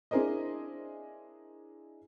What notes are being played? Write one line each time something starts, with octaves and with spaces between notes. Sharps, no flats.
D4 E4 G#4 A#4 C5 D#5